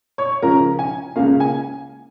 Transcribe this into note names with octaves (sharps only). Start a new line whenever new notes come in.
C#5 C#6
C#2 C#3 F3 A#4 A#5
G#5
C#2 C#3 A#3 C#4 F5
G#5